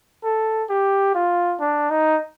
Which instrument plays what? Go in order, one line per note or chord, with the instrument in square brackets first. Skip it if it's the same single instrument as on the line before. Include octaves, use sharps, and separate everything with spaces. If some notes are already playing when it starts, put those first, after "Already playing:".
[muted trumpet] A4
G4
F4
D4
D#4